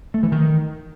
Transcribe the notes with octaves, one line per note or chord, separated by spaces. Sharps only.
A3
E3
D#3